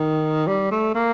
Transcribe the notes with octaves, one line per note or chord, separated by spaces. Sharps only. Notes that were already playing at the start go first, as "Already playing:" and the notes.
Already playing: D#3
G3
A3
A#3